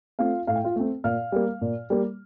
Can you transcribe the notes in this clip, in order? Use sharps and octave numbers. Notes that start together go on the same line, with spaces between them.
A3 C4 F4 F5
A2 F5
G5
F4 F5
A3 C4
A#2 F5 F6
G3 A#3
A#2
G3 A#3